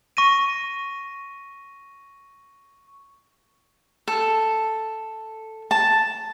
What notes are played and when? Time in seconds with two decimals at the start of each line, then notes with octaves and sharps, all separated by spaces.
0.17 C#6 A#6 D#7
4.08 A4
5.71 A5